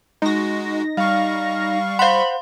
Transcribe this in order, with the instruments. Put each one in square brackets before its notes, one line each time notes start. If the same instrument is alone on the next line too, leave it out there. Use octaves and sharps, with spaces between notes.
[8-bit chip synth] G#3 F#4 [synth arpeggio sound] D#4 A#6
[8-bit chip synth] G3 C#6 [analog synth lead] F5
[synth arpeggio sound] C5 F#5 [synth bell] F5 C6 [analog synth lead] B5